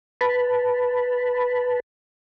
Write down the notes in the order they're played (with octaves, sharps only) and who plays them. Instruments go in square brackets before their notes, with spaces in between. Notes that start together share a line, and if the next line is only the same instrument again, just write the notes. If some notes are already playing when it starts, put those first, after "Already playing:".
[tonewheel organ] B4 A5 B5